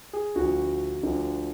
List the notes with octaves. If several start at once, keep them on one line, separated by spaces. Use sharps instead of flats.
G#4
D2 D3 F3 F#4
D2 D3 F3